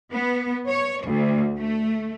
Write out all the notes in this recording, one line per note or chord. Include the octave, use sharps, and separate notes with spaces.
B3
C#5
D2
A3